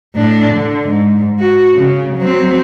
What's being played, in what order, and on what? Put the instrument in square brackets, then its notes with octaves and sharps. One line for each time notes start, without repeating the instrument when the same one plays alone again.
[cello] A2 D4
D3
G#2
F#4
C#3
F#3 C4